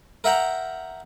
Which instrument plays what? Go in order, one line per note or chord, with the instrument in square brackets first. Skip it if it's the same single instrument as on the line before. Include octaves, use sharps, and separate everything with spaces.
[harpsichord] A#4 E5 F#5 G5 A#5